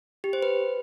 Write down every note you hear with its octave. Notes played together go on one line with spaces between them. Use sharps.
G4
C5
B4